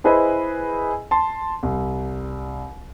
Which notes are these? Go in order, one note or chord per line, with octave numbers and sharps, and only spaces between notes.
E4 G#4 B4 C5 D#5 G#5
A5 C6
C2